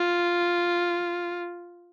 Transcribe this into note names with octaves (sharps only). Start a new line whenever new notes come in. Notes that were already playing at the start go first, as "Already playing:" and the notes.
Already playing: F4